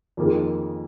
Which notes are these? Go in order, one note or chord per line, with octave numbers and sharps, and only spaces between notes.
F2 D#3 A#3 F4 G#4